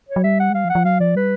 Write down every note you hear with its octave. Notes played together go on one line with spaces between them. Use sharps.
C#5
F#3
G3 E5
F#5
G#3
G3 F5
F3
F#5
F3
F#3 F5
F3 D5
G3 B4